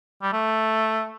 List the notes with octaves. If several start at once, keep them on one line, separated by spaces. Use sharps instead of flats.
G3
A3